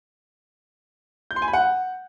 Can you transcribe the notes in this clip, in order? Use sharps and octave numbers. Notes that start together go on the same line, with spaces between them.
G6
C6
G#5
B5
F#5